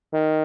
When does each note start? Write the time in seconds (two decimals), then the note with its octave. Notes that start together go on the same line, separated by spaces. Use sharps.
0.14 D#3